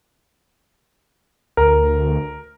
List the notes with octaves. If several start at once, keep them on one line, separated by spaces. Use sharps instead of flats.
D2 A#4